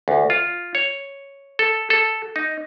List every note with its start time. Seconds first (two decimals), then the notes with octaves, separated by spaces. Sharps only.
0.08 D2
0.30 F4
0.75 C#5
1.59 A4
1.90 A4
2.36 D#4